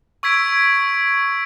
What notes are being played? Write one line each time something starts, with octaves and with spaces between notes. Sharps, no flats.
C#6 E6 G#6 B6 D7